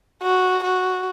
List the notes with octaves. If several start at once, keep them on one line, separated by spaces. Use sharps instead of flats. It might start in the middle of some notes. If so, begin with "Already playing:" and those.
F#4
F#4